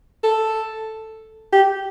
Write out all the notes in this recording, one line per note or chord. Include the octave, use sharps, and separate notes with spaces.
A4
G4